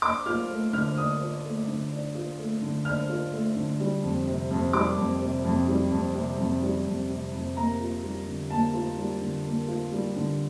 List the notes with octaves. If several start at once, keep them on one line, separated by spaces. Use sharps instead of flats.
D4 D6
F4 F6
A3
D3 F6
D4 D#6
F4
A3
D3
D4
F4
A3
D3
D4 F6
F4
A3
D3
G3
F2
C3
F2
G3 D6
F2
C3
F2
G3
F2
C3
F2
G3
F2
C3
F2
A#3 A#5
F4
G3
D3
A#3 A5
F4
G3
D3
A#3
F4
G3
D3